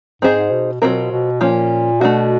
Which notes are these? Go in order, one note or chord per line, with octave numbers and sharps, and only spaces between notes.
G#2 C4 D#4 G#4 C5 D#5
G#2
B2
B2 F#3 A3 C4 F4 A#4
B2
A#2 F3 A#3 C#4
B2 A3 D4 F#4